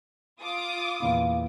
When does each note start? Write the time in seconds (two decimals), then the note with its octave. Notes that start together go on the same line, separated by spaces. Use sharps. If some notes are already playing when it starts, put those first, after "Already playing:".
0.40 F4 D6 D#6
1.00 E2 A#2 E4 F5